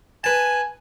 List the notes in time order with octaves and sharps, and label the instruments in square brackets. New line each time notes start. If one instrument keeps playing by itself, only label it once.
[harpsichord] B4 A5 [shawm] G#5